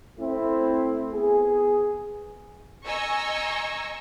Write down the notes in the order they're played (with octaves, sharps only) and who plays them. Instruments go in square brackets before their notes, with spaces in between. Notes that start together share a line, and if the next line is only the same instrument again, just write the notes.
[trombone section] A3 C4 E4
B3 G#4
[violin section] D#5 G#5 A#5 C#6 E6